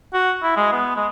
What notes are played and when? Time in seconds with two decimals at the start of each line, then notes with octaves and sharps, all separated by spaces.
0.14 F#4
0.43 E4
0.56 G#3
0.73 B3
0.96 G#3